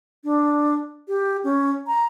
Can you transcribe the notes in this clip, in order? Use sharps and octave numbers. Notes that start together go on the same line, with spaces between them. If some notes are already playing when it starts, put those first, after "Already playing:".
D4
G4
C#4
A#5